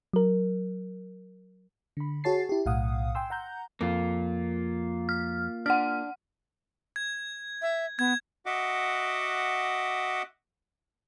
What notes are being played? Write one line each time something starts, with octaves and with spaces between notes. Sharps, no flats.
F#3 A#4
D3 B5
F#4 G#4 C#5 A5 A6 C7
E4 G4
B1 A2 F5 F#5 D#6
G5 G#5 C6 E6
F#5 A#5 G6
F2 A#3 F4
F6
D4 F#5 F6
G#6
E5
B3 G#6
F#4 D#5 E5 F#5 D6